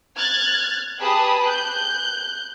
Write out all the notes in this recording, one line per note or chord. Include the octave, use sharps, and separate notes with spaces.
F6 F#6 G#6 A6
G4 G#4 B4 A5 B5 D#6
F#6 G6